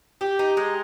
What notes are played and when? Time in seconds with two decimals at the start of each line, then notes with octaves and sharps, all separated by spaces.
0.21 G4
0.39 D#4
0.57 G#3